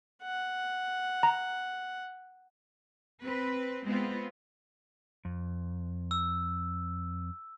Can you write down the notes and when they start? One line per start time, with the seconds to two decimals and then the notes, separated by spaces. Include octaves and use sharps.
0.22 F#5
1.23 A#5
3.23 C4 B4
3.84 G#3 B3 C4 F4
5.25 F2
6.11 E6